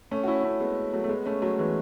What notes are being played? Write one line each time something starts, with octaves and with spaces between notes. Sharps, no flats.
A3 C#4
F#4
C#4 E4
A3 C#4
G#3 B3
F#3 A3
A3
G#3 B3
A3 C#4
F#3 A3
E3 G#3